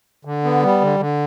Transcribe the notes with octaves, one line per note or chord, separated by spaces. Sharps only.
D3
B3
G3
D3
D3